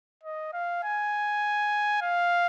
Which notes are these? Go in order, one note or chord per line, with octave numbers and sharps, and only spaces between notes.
D#5
F5
G#5
F5